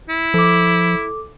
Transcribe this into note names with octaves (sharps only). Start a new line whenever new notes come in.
E4
F3 A4 D6